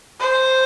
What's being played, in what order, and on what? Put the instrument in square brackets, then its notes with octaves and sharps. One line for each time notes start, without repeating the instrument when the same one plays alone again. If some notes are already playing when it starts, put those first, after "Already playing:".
[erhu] C5